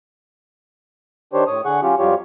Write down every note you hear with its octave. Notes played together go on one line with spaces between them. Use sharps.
D#3 D4 G4 C5 C#5
A2 C#5 D#6
D3 G#4 F#5 C#6
F#3 C#4 F4 G4
F2 F#3 G3 F4 G4 C#5